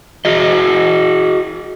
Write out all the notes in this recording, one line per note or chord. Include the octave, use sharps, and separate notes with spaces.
F#4 G#4 D#5